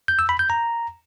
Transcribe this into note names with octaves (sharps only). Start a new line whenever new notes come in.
G6
E6
B5
G6
A#5